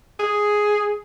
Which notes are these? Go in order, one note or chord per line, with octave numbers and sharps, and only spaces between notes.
G#4